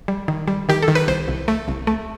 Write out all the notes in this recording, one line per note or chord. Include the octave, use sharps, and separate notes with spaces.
G3
D#3
G3
D#3 G4
A4
D#3
B4
C2 C5
C2
A3
C2
A3